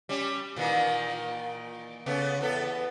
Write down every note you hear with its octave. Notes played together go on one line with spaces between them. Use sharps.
G3 C#4
A#2 D#3 E3
C#3 A3 B3
E2 B3 A4